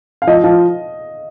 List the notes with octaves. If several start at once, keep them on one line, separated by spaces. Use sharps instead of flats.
F5
F3 D#5
F3